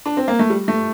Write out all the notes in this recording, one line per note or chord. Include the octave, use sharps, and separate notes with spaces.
D4
C4
A#3
A3
G3
A3